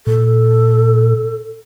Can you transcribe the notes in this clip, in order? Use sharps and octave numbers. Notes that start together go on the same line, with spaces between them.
A#2 A4